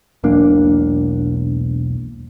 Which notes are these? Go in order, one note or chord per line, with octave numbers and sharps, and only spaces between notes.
E1 B1 A#3 D4